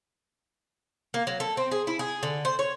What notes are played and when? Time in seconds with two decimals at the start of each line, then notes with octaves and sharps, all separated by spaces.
1.14 A#3
1.27 F#3
1.40 A4
1.57 C4
1.71 G#4
1.87 E4
1.99 G#4
2.23 D3
2.45 C5
2.59 C#5